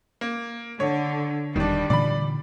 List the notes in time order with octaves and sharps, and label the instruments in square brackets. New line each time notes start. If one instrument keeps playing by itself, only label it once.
[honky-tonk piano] A#3
[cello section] D3 [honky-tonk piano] C#5
[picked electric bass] E1 [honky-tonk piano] D#3 D4 [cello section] G3
[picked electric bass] A#2 D3 E3 [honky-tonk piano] D5 B5